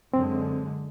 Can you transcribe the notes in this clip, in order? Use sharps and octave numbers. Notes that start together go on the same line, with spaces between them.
F#2 D3 G#3 C4